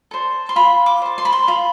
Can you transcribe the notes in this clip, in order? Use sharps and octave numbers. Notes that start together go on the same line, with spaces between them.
A4 C5
C6
F4 B5
D6
A4 C5
C6
B5
C6
F4 B5